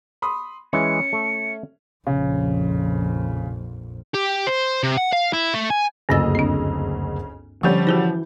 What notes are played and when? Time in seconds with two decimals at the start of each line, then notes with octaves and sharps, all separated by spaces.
0.22 B5 C6 D#6
0.73 E3 G#3 C#4 C#7
1.13 A3
2.07 A#1 F2 C#3
4.14 G4
4.47 C5
4.83 C3
4.98 F#5
5.13 F5
5.33 E4
5.54 A3
5.70 G#5
6.09 F#1 D2 G2 C#3 A#3 D#5 E6 A6
6.35 C4 D4
7.63 D3 F3 G3 C#4 C#6 E6 G6
7.87 E3 F#4 G#4 C5